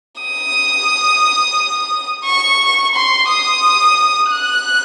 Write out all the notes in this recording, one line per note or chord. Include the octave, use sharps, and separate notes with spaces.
D#6
C#6
C6
D#6
F#6